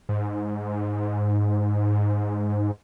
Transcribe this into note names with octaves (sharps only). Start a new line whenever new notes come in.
G#2